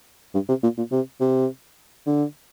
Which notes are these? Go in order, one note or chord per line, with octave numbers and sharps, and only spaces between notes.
G2
C3
A#2
A#2
C3
C3
D3